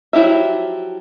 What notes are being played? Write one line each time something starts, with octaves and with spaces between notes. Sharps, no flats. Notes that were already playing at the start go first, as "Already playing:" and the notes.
F3 F#3 E4 G4 E5